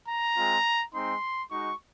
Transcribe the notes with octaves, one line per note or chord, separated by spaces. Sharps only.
A#5
G#3 C4 F4
G#3 C4 D#4 C6
G#3 D#4 F#4 C#6